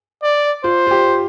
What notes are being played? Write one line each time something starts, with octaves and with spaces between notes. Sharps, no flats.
D5
F4 C5
F4
G4